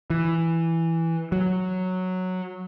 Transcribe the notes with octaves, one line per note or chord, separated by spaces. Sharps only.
E3
F#3